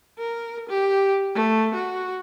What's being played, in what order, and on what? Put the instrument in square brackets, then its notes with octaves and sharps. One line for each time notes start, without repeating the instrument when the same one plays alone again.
[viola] A#4
G4
A3
F#4